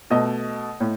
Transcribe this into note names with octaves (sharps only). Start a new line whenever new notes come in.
B2 A3 D#5
A2